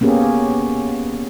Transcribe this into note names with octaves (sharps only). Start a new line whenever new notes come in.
A#3 B3 C#4 G4 G#4